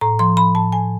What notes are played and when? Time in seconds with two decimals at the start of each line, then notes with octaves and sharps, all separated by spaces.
0.01 A2 A#5
0.19 F3 C6
0.37 F3 B5
0.55 A2 A5
0.72 A2 G#5